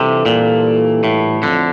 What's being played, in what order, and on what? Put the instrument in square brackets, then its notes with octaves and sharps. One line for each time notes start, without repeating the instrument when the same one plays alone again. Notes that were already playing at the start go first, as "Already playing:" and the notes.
Already playing: [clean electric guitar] C3 [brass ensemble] E3 G3 D4 F4 A4
[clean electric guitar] A#2
A2
[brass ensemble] F2 [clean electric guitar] D3